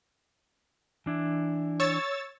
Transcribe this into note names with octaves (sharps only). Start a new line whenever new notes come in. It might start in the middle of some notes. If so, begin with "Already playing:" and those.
E3 D4 E4
C#5 E6 A6